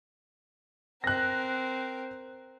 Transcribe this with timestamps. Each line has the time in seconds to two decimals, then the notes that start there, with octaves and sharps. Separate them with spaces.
1.04 C4 A#4 F#6 A#6